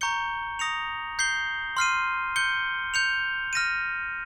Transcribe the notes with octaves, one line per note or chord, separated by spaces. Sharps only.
A#5 C#6 G6 C#7 G7
D#6 A#6 C#7 F7
G6 C7 G7
C6 F6 C7 D#7
G6 C#7 G7
G6 C#7 F7
F6 A#6 D#7